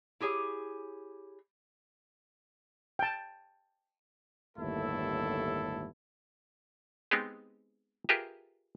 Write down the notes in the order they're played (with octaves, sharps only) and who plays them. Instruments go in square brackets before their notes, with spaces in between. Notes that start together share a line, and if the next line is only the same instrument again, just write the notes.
[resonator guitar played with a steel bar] E4 G4 G#4 C#5
[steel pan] G5 A5
[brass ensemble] G1 D#2 A2 A3 E4 A4
[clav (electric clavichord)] G#3 B3 C4 D#4 G4 G#4
F4 G4 G#4 A#4 B4 E5